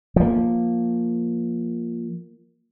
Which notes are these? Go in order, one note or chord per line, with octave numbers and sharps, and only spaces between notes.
F3 A#3